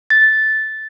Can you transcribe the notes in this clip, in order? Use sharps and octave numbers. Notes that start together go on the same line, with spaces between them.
A6